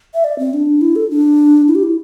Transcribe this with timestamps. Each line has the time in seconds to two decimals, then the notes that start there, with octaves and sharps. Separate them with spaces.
0.14 E5
0.24 D5
0.39 C4
0.54 D4
0.81 E4
0.96 A4
1.10 D4
1.68 E4
1.75 G4
1.83 E4